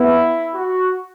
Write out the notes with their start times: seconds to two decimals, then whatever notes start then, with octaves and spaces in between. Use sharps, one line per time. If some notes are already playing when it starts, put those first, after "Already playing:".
Already playing: B3 E4
0.55 F#4